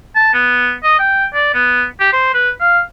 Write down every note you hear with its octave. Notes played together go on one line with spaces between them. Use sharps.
A5
B3
D#5
G5
D5
B3
G4
C5
B4
F5